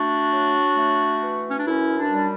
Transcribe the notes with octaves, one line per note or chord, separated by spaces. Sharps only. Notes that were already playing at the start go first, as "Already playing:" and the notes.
Already playing: A3 D4 F#4
F#3
A3
E3
C#4
D4
F#2 C#4 E4
D4
G3